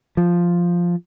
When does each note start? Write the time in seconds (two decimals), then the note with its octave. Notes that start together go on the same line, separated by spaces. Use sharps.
0.17 F3